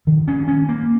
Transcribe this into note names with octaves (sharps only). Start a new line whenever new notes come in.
D#3
C#4
C#4
A#3